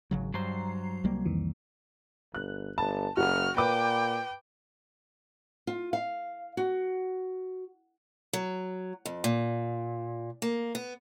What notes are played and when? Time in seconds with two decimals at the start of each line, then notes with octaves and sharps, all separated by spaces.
0.11 G#1 C#3 F#3
0.34 G2 F#3 C5 A#5 C7
1.04 C2 G3 A#3
1.25 F2 D#3 E3
2.35 G1 F#6
2.78 G1 A5
3.17 F#1 F#4 F6
3.57 A#2 B4 G5 D6
5.67 F4
5.93 F5
6.57 F#4
8.33 F#3
9.05 F2
9.24 A#2
10.42 A#3
10.75 B3